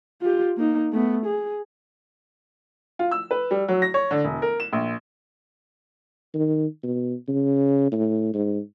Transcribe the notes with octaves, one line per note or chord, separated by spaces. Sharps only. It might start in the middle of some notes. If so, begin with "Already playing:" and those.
F4 G4
A#3 D#4
A3 B3
G#4
F4
E6
B4
G3
F#3
A#6
C#5
D3
E1
A#4
E7
A#1
D#3
B2
C#3
A2
G#2